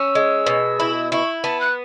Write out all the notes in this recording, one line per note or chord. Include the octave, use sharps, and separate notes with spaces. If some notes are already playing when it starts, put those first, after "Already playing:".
Already playing: C#4 E6
G#3
B2
E4
E4 C#6
B3 A5
F#6